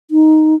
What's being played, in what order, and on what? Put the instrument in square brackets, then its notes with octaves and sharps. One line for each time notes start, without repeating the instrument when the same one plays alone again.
[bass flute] D#4